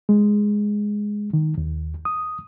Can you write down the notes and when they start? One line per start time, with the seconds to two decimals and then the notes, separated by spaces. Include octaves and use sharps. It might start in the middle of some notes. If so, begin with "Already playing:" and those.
0.09 G#3
1.33 D#3
1.58 D#2
2.05 D#6